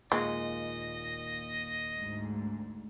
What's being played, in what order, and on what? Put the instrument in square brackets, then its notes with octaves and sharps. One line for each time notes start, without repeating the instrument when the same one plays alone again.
[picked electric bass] D#2 A#2 [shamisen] G#3 [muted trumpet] D#5
[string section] D2 G#2